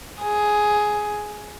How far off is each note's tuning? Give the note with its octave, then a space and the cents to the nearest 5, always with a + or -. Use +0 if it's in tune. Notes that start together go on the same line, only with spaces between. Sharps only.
G#4 +10